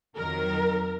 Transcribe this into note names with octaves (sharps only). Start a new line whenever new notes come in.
F2 D#3 F#3 A#4